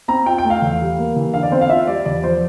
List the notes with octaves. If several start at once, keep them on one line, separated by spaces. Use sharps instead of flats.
C4 A#5
F4 G5
G5
A3
F5
E2
G3
A#3
E3
D3 F5
D5
C4 C5
F5
F4 E5
G3 D5
E2 D5
F3 C5